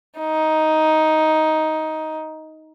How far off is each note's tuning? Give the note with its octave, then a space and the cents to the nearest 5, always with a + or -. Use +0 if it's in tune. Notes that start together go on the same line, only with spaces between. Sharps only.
D#4 +10